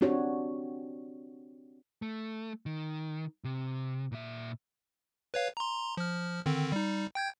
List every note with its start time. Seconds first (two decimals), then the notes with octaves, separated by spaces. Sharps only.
0.01 C4 D4 F#4 G4 C#5
2.02 A3
2.66 D#3
3.44 C3
4.12 A#2 E5
5.34 B4 C#5 F5
5.57 A#5 C6
5.97 F3 F6
6.46 D3 D#3 C4
6.72 G3 D#4
7.15 G5 G6 G#6